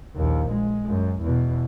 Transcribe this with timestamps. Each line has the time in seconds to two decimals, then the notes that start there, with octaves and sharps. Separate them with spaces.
0.16 A#1 D#2
0.51 G#3
0.88 F#2
1.22 E2 B2